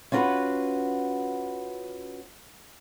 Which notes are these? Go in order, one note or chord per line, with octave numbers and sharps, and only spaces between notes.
C#4 F4 F#4 A#4 B4 F#5